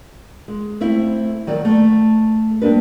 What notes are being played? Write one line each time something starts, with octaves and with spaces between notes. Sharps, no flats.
G#3
A3 C4 E4
D#3 F#3 A4 D5
A3
G2 A#3 D4 B4